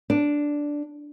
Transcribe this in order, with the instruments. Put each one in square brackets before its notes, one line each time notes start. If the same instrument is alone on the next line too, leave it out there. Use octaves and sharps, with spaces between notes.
[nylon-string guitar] D4